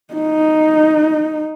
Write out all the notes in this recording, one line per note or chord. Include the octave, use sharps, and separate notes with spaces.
D#4